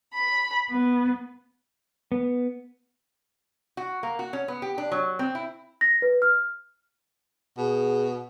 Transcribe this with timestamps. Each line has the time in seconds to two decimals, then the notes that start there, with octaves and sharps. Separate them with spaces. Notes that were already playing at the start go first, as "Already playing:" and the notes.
0.13 B5
0.70 B3
2.12 B3
3.77 F#4
4.03 A#3
4.19 F#4
4.33 C#4
4.48 B3
4.62 G4
4.78 D4
4.92 F#3
5.19 C4
5.35 E4
5.81 A#6
6.02 B4
6.22 F6
7.58 B2 G#4